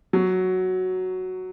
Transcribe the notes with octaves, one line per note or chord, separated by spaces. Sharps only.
F#3